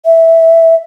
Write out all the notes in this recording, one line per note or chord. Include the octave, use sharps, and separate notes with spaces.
E5